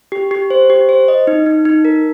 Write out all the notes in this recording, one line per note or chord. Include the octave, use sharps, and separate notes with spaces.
G4
G4
C5
G4
C5
D#5
D#4
D#4
D#4
A#4